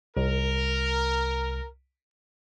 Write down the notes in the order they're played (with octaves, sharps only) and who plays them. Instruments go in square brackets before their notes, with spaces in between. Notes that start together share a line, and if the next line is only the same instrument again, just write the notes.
[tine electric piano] C2 [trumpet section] A#4